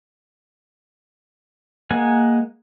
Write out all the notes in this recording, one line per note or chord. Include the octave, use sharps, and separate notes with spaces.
G#3 A#3 F#5 G#5